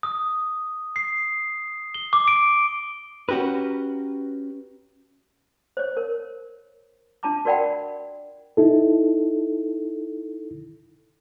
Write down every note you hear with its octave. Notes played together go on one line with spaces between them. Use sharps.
D#6
C7
G7
D6
D7
C#4 F#4 G4 A#4 B4
C5 C#5
A#4
D4 F4 A5 A#5 D6
F#4 A#4 D5 F#5 G5 B5
D#4 E4 A4